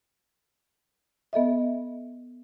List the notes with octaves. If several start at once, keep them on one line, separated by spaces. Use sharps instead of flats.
B3 A4 D#5 E5